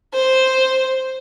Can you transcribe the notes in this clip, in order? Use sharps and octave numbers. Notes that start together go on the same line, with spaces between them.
C5